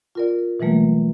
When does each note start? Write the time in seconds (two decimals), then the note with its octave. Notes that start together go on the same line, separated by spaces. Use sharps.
0.15 F4 A#4 D5
0.60 B2 E3 F#3 G3 A3 A#3